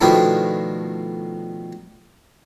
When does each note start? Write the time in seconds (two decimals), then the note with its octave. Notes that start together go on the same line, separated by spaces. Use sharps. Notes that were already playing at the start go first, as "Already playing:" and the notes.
0.01 B2 D#3 F3 A3 D4 E4